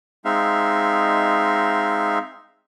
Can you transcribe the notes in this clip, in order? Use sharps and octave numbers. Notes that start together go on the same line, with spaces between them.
G#3 C4 D#4 E5 F5